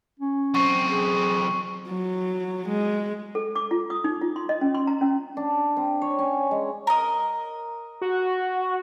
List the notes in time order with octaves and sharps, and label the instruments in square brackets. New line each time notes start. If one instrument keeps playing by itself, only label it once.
[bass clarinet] C#4
[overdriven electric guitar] F#2 C4 [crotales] C#6
[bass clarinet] G#4
[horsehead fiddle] F#3
G#3
[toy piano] A4
D6
F4
D#6
D#4
F4
C6
D#5
C#4
C6
A#5
C#4
[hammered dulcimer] D4
C4
C#5
C#4
G#3
[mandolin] A#4 D#5
[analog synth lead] F#4